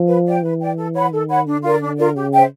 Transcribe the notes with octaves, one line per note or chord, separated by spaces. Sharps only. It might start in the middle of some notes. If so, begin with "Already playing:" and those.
Already playing: F3
B4
D5 G5
E3 B4
D5 G5
A4
C#5 F#5 B5
D#3 A4
C#5 F#5 B5
D3 D4
F4 A#4 D5
D4
F4 A#4 D5
C#3 G4
C5 E5 G5